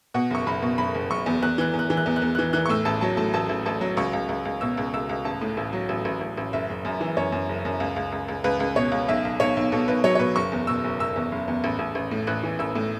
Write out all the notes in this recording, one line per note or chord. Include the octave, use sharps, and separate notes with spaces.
B2 F#5
F#1 C#6
F#1 B5
B2
F#1 B5
F#1
F#1 C#6
E2
E2 F#6
E3 F#6
E2
F#6
E3
F#6
E2
F#6
E2
E3 F#6
E3 F#6
C#6
A2 E6
A1 A5
F#3 A5
A2 A5
A1 A5
A1
A1 A5
F#3
C#2 C#6
C#2
C#2
C#2
B2 E6
C#2
C#2 E6
C#2
A1 A5
A2
A1
F#3
A1
A1
A1
A1
F#1 E5
F#1
F#2
E3
F#2 C#5
F#2
F#1
F#2
C#2
C#2
C#2
C#2
C#2 B4
C#2
B2 C#5
C#2
B1 E5
B1
B1 C#5
B1
B2 A4
B1 B4
F#3 C#5
C#5
B2 B4
F#1 C#6
E2
B2 E6
F#1
F#1 E6
E2
F#1
E2
A1
A1
A1
A2
A1 F#6
E3
A1 E6
A2